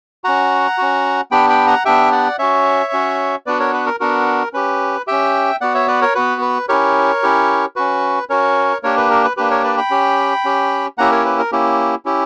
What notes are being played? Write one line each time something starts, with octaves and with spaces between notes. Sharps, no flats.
C#4 F#4 F#5 A#5
C#4 F#4
B3 D4 G4 G5 B5
G5 B5
F#5 A#5
B3 D4 G4 E5 G5
D5 F#5
C#4 F#4 C#5 E5
C#4 F#4
B3 D4 F#4 B4 D5
A#4 C#5
B4
A#4
B3 D4 F#4 A#4
C#4 G4 B4
C#4 G4 E5 G5
B3 F#4 D5 F#5
C#5 E5
B4 D5
A#4 C#5
B3 F#4 B4
B4
C#4 E4 G4 A#4 C#5
C#4 E4 G4
C#4 F#4 B4
C#4 F#4 A#4 C#5
A#3 D4 G4 A#4 C#5
B4
A#4
B4
A#3 D4 G4 B4
A#4 C#5
B4 D5
G5 B5
C#4 G4
C#4 G4
A#3 C#4 E4 G4 F#5 A#5
A#4 C#5
B4
A#4
A#3 C#4 E4 G4
C#4 E4 G4